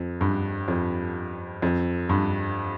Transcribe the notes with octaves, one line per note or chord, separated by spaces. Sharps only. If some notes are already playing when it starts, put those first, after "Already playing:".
Already playing: F2
G2
F2
F2
G2